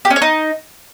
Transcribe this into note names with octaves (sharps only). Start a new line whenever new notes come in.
G4
C#4
C#5
D#4